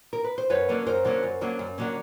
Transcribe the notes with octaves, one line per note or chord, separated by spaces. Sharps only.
A#4
B4
C5
F#2 B4 C#5
D3 F#3 A#3 C#4
F#2 A#4 C5
D3 F#3 A#3 C#4
F#2
D3 F#3 A#3 C#4
F#2
D3 F#3 A#3 C#4